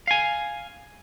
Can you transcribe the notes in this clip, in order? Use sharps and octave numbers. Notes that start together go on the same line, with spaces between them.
F5 G#5